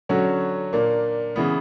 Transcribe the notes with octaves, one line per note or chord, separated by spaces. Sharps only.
D3 F#3 C#4 F#4
A#2 A#3 D4
C#3 E3 B3